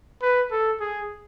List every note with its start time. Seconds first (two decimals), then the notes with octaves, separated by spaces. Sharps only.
0.22 B4
0.51 A4
0.80 G#4